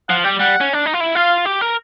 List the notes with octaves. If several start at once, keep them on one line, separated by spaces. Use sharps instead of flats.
F3 F#5
G3 G5
G3 F#5
C#4
D4
D#4
F4
E4
F4 F5
G4
A#4